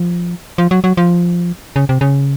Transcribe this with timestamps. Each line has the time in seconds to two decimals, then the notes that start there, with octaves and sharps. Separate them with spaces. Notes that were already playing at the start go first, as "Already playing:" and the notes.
Already playing: F3
0.58 F3
0.71 F#3
0.84 F#3
0.97 F3
1.76 C#3
1.89 C3
2.01 C#3